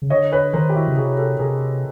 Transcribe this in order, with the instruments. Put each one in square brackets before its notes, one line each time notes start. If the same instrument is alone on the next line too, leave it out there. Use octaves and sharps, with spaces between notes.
[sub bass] C#3
[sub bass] D3 [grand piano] C#5 D#5
[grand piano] B4 C#5
[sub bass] D#3 [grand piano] A#4 C5
[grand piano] G4
E4 F#4
[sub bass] C#3
[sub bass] C3 [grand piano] F#4 G#4
[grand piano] G4 A4
[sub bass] C3 [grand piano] G#4 A#4